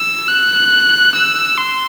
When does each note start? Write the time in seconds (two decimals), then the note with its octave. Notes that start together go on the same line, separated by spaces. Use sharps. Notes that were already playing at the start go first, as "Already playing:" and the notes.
Already playing: E6
0.28 F#6
1.15 E6
1.58 C6